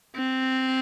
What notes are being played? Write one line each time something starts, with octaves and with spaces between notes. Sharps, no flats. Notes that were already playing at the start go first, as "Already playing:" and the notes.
C4